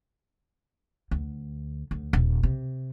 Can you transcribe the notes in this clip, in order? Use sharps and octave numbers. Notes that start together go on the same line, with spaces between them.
D2
D2
D#1
C3